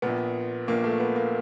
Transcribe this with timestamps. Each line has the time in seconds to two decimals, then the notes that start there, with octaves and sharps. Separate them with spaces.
0.02 A#1 A#2 B3
0.68 A#1 A#2 A#3
0.84 A3
1.00 B3
1.16 A#3